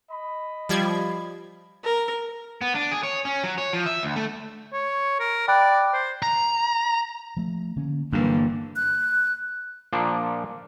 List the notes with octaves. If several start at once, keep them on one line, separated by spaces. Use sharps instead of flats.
D#5 B5
F3 G3 G#6
A#4
B3
D4
G#4
C#5
C#4
F#3
C#5
F3
E5
D2
A3
C#5
A#4
D5 G5 B5 F#6
C5
A#5
F3 A3
D3 A#3 C#4
G2 D3 E3 F#3 G3 A#3 D4
F#6
A#2 F3 A#3 D4